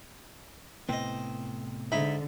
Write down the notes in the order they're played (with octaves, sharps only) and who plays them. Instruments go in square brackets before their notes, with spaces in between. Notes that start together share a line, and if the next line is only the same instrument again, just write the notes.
[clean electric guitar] A2 C3 B3 [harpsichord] C4 D#5
[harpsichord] G#2 D#4 B5 [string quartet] D3 [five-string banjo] E5